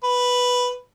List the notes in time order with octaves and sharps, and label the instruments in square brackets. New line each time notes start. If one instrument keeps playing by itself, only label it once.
[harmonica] B4